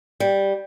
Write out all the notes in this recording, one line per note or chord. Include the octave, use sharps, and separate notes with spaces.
G3